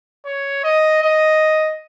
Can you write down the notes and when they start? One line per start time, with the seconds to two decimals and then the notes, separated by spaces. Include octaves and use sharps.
0.25 C#5
0.64 D#5
1.03 D#5